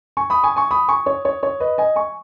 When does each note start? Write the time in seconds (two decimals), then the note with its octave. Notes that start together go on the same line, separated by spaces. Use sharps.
0.17 G#5 C#6
0.30 B5 D#6
0.43 G#5 C#6
0.56 G#5 C#6
0.71 B5 D#6
0.88 G#5 C#6
1.06 C#5
1.25 C#5
1.43 C#5
1.60 B4 D#5
1.78 D#5 G#5
1.96 G#5 C#6